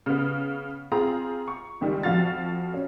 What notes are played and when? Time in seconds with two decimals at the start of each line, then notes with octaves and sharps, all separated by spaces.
0.06 C#3 B3
0.92 C4 F4 G#4 A#5
1.48 C#6
1.81 C#2 D#3 G3
2.03 F2 F3 F#4 F5 A6
2.74 C#4